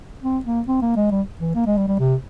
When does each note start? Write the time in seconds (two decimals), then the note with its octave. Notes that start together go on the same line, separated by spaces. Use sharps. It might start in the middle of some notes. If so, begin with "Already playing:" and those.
0.23 C4
0.45 A#3
0.68 C4
0.82 A#3
0.97 G#3
1.11 G3
1.41 E3
1.55 A#3
1.67 G#3
1.77 G3
1.88 G3
2.00 C3